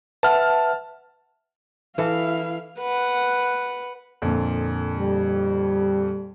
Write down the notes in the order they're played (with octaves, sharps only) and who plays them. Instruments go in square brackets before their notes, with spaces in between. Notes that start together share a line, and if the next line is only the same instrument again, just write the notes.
[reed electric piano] B4 E5 F#5 [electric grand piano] A5 F6
[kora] E3 A4 [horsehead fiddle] E4 F5
[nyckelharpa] B4 F#5
[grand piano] F2 A#2 D3
[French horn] G3